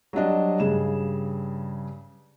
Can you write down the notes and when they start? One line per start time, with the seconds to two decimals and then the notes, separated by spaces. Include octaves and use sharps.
0.13 F#3 G3 D4 D#5
0.60 G2 C#3 G#4 E7